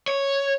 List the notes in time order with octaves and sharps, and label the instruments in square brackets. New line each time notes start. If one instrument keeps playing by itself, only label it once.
[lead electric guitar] C#5